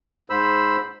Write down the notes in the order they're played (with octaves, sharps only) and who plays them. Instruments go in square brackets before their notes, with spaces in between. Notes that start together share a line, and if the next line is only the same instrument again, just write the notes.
[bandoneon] G#2 C5 B5 E6